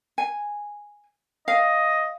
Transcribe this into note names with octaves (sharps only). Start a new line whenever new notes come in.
G#5
D#5 F5